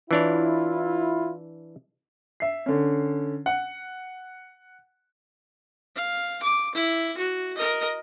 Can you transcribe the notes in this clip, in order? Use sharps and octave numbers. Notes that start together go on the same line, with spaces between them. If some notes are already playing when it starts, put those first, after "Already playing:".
E3 D4 E4 F4 C#5
E5 C7
D3 C#4
F#5
F5
D6
E4
F#4
A#4 D#5